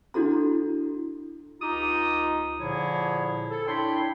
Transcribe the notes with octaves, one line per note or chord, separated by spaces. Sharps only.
D4 E4 F#4 A4 A#5
C#2 D#4 F4 G4 A#5 D#6
A#2 D3 F3 E4 G#4 C#5
A4
D4 E4 C#5 G5 B5 C6